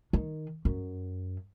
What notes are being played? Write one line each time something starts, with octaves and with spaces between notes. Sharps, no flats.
D#3
F#2